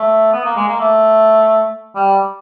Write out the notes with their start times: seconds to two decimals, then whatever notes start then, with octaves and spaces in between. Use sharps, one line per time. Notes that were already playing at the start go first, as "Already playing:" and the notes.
Already playing: A3
0.32 B3
0.45 A#3
0.56 G#3
0.68 A#3
0.79 A3
1.95 G3